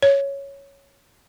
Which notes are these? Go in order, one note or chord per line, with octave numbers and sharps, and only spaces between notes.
C#5